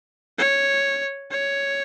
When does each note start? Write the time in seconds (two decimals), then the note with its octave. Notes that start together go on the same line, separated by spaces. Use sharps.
0.39 C#5
1.31 C#5